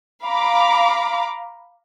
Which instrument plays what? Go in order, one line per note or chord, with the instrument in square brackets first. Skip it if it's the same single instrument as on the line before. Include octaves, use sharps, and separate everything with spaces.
[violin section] F5 A#5 B5 D6